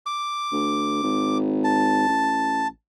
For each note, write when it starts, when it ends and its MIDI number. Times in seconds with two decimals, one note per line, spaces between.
0.06 1.38 86
0.52 0.99 38
1.03 2.04 32
1.64 2.68 81
2.08 2.67 33